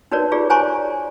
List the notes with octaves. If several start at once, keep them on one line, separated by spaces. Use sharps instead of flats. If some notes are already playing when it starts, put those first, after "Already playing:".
D#4 F#4 A#4 B4 C#5 D5
F4 G4 G#4 D5
C5 C#5 G#5 A#5 C6 C#6